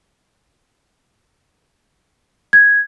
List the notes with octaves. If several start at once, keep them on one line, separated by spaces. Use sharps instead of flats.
G#6